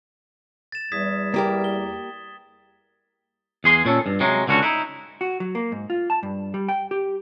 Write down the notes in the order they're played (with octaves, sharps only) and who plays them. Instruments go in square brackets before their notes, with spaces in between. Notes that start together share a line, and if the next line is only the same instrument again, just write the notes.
[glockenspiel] A6 E7
[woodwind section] E2 G3 [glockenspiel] D#6 G#6 B6
[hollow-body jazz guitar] A#3 G4 A#4
[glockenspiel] G7
[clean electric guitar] E2 G#4 C6
A#2 C#4 A4
G2
C3 F#3 G#3
C#2 D3 C#4 F#4
D#4 E4
[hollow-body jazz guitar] F#4
F#3
A#3
G#2
F4
A5
G2
G3
G5
G4